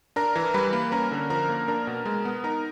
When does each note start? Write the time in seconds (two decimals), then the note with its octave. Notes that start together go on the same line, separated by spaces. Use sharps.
0.16 D4 A#4 A#5
0.36 E3
0.54 G3 B4 B5
0.73 A#3
0.92 C#4 A#4 A#5
1.11 D3
1.30 F3 A#4 A#5
1.49 A#3
1.68 D4 A#4 A#5
1.87 B2
2.06 G#3
2.25 B3
2.44 D#4 A#4 A#5